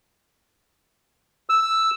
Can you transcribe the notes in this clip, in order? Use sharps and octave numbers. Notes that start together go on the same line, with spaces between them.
E6